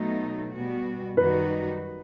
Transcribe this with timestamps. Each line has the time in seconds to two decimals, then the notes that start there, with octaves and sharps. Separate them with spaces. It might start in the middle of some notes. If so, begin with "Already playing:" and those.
Already playing: B2 F#3 A3 D#4
0.53 B2 G3 B3 F#4
1.17 F#2 D#3 G3 D#4 F#4 B4